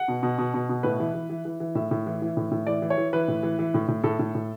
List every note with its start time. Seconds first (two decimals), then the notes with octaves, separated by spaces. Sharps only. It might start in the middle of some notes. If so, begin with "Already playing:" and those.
Already playing: F#5
0.08 B2
0.23 B2
0.38 B2
0.54 B2
0.69 B2
0.83 A2 B4
1.00 E3
1.14 E3
1.30 E3
1.45 E3
1.60 E3
1.75 A2 E5
1.91 A2
2.06 E3
2.22 E3
2.37 A2
2.51 A2
2.67 E3 D5
2.82 E3
2.90 C#5
2.98 E3
3.13 E3 B4
3.28 A2
3.43 E3
3.59 E3
3.74 A2
3.88 A2
4.04 A2 A4
4.19 A2
4.35 A2